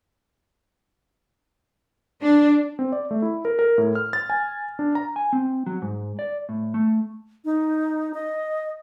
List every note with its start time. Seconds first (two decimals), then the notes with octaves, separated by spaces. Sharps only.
2.21 D4
2.79 C4
2.92 D5
3.11 A3
3.22 E4
3.45 A#4
3.59 A#4
3.78 A2
3.95 F6
4.13 A6
4.30 G#5
4.79 D4
4.95 A#5
5.16 G#5
5.33 C4
5.66 F#3
5.82 G#2
6.19 D5
6.49 A2
6.74 A3
7.45 D#4
8.14 D#5